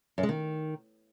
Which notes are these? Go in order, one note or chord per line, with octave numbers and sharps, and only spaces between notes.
F#2
G#3
D#3